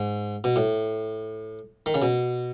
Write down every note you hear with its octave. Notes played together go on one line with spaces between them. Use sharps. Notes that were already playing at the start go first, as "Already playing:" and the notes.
Already playing: G#2
B2
A2
D#3
C#3
B2